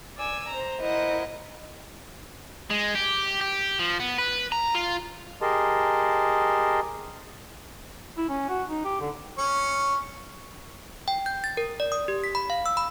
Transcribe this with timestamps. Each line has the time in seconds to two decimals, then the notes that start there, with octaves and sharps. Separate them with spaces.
0.16 D5 G#5 E6
0.48 C5 A#5
0.80 E4 A#4 C5 D#5 F#5
2.70 G#3
2.95 G4
3.41 G4
3.79 F3
4.00 B3
4.18 B4
4.52 A#5
4.75 F4
5.42 G4 G#4 A#4 D#5 A5 C6
8.18 E4
8.29 C#4
8.49 F#4
8.69 D#4
8.85 G4
9.00 D3
9.38 C#4 C#6
11.08 G5
11.26 G6
11.44 A6
11.57 A#4
11.80 D5
11.92 D#6
12.08 G4
12.24 B6
12.35 B5
12.50 F5
12.66 E6
12.77 B5